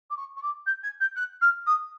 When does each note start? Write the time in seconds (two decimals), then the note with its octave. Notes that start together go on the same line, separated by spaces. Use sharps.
0.10 D6
0.17 C#6
0.37 C#6
0.43 D6
0.66 G6
0.83 G#6
1.00 G6
1.16 F#6
1.41 F6
1.67 D#6